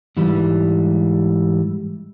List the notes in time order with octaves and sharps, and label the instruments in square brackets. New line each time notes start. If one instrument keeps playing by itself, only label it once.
[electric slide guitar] G#2 E3 G3